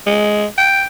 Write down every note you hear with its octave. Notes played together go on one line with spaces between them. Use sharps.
G#3
G5